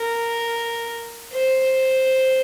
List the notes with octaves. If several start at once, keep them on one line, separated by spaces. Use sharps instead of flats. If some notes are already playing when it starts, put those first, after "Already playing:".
Already playing: A#4
C5